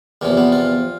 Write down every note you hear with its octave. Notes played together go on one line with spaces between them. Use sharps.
E2 C3 F3 A#3
B3
F4